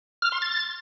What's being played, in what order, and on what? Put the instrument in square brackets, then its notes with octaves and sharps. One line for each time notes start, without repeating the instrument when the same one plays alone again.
[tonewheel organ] F6
C6
A6